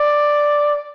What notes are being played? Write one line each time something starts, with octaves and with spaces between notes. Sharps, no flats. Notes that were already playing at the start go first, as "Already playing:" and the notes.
Already playing: D5